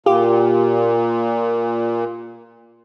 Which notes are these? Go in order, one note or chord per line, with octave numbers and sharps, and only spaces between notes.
A#2 F4 G4